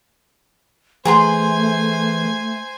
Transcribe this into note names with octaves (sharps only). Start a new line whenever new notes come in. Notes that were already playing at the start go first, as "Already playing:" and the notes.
E3 A3 G#4 C5 G#5 A#5 C6